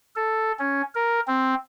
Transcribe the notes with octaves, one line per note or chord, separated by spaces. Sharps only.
A4
C#4
A#4
C4